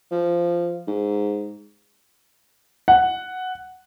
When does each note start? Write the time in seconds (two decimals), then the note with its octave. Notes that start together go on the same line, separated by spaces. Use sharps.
0.11 F3
0.88 G#2
2.88 F#5